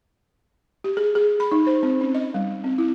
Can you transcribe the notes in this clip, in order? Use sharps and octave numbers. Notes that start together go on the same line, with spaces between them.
G4
G#4
G#4
B5
D#4
C5
C4
C#4
D#5
G3
C4
E4